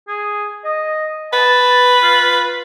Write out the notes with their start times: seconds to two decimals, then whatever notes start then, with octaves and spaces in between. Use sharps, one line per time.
0.08 G#4
0.65 D#5
1.33 B4 A5
2.02 F4